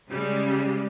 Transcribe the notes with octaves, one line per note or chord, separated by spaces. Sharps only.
C#3 G3 G#3